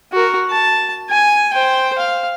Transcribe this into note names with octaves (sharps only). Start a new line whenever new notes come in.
F#4 A#4
A5
G#5
C5 G5
F5